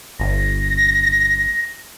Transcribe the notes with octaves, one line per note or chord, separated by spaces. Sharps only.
G1 A#6